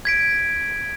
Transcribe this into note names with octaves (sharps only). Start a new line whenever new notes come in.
G#6 B6 D7